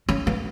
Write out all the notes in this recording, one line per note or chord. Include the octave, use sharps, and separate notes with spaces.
C#4
B3